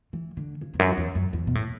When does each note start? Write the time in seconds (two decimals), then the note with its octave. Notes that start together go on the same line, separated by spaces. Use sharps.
0.13 E3
0.37 D3
0.61 C#3
0.74 E2
0.79 F#2
0.97 E2
1.15 F#2
1.33 E2
1.47 B2
1.55 A2